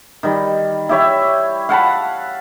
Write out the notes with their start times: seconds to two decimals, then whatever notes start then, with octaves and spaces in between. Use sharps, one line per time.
0.23 D#3 G3
0.89 E4 G4 C#5 E5
1.69 F5 F#5 A5 B5